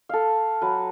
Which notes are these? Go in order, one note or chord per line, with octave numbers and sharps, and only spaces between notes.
A4 F5
F#3 B4